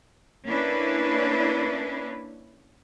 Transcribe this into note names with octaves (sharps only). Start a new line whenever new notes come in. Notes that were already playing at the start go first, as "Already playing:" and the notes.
A#3 C#4 D4 E4 B4